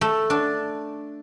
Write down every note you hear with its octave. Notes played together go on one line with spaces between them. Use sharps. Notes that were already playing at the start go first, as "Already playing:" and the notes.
A3
D4